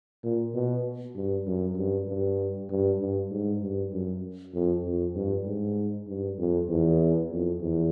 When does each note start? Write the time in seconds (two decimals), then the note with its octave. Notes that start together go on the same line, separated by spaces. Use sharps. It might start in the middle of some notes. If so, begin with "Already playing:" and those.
0.24 A#2
0.54 B2
1.16 G2
1.47 F#2
1.77 G2
2.08 G2
2.70 G2
3.00 G2
3.31 G#2
3.62 G2
3.93 F#2
4.54 F2
4.84 F2
5.16 G2
5.46 G#2
6.08 G2
6.38 F2
6.69 E2
7.31 F2
7.61 E2